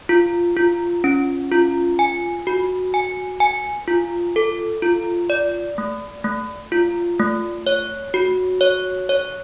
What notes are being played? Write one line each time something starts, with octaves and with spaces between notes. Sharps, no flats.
F4
F4
C#4
F4
G#5
F#4
G#5
G#5
F4
A4
F4
D5
A3
A3
F4
A3
C#5
F#4
C#5
C#5